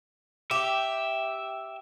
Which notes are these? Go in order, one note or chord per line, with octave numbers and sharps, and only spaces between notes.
G4 E5